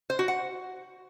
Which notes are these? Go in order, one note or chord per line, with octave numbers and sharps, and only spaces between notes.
C5
F#4
F#5